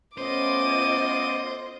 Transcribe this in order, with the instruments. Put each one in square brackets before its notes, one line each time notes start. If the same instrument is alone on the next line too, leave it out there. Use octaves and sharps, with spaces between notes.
[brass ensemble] A3 B3 C#4 [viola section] F4 D#5 [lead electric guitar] C5 [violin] D6 D#7